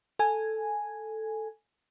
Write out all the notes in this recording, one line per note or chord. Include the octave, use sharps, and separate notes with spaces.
A4 G#5